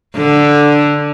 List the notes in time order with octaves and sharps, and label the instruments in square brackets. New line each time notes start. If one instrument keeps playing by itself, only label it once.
[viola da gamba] D3